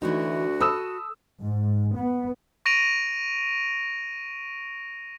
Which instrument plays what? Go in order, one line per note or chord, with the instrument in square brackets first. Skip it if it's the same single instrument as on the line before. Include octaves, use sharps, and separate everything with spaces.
[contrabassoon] D2 [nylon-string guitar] E3 A3 D#4 [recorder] F#4
[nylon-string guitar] A4 [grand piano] B5 D#6 E6
[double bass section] G#2
B3
[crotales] C#6 A#6 D7 D#7 F7